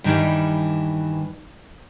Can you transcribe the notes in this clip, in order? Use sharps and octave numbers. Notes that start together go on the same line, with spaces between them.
G2 D#3 E3 G3